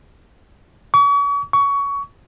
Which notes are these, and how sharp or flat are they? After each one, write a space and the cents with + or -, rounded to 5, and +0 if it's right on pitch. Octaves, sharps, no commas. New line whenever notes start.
C#6 +40
C#6 +20